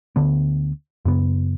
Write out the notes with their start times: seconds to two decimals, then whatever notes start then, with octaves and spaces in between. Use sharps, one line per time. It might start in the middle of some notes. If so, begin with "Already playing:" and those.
0.16 D2 D3 B3
1.05 F#2 C#3 B3